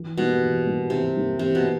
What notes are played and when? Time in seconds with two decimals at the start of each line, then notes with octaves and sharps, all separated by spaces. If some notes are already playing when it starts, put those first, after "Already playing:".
Already playing: E3
0.18 B2 G3 A#3
0.42 E3
0.65 G3 A#3
0.90 C3 E3
1.15 G3 A#3
1.39 C3 E3
1.55 B2
1.63 A#3